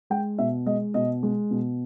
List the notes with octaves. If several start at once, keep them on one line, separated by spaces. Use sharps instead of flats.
G#3 G5
B2 E5
G#3 D#5
B2 D#5
G#3
B2